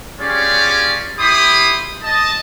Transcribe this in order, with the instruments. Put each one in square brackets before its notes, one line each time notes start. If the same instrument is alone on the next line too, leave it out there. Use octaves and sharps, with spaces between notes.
[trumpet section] C#4 F4 G4 G#4 C#5 D5
E4 G4 B5 C6 D#6
D#5 A5